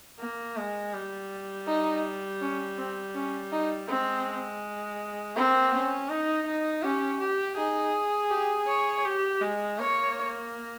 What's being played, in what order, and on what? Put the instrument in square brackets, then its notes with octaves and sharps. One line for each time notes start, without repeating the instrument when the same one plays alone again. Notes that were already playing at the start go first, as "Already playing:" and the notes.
[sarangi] A#3
G#3
G3
[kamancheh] D#4
C#4
C4
C#4
D#4
[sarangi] G#3 [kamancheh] C4
[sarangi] A#3 [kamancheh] C4
[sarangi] C#4
D#4
D#4
[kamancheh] C#4 [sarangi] G4
[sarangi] G4
[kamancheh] D#4 [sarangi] G#4
[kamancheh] G4
C#5
[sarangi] G4
G#3
[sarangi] A#3 [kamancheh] C#5